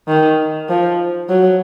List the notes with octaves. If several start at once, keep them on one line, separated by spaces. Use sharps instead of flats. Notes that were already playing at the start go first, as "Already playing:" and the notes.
D#3
F3
F#3